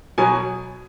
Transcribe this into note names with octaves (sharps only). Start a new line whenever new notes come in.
B2 F#3 G#5